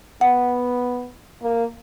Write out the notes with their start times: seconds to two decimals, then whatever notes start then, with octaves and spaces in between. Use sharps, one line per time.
0.21 B3 F#5
1.42 A#3